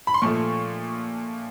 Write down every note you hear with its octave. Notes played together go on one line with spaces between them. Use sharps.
B5
C6
A#2 F3 A3 C#6